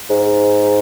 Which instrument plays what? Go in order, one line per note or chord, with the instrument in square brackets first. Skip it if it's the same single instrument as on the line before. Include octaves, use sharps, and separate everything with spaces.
[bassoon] G#2